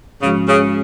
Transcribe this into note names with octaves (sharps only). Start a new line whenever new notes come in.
G#2 C#3 F3 G#3 C#4 F#4
C#3